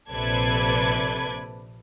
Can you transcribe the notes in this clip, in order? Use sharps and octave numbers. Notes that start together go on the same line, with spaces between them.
A#1 C3 A4 B4 D5 G#6